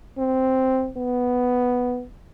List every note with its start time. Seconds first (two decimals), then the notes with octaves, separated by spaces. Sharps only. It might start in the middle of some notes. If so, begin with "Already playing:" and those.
0.18 C4
0.97 B3